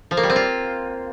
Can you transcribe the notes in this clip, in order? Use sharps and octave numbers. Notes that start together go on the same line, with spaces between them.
F3
A#3
G3
C4
F4